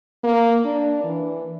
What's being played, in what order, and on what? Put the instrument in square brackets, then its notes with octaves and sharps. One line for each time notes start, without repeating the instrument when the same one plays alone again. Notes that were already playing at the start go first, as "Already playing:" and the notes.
[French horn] A#3
D4
E3